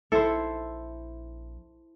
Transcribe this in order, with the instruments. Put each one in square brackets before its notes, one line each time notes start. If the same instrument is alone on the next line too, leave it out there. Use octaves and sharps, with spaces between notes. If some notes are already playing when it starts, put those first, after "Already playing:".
[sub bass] A#1 [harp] E4 C5 [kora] A4